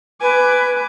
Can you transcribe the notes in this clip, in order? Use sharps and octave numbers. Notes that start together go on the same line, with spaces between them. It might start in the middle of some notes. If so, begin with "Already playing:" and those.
B4 G#5 D6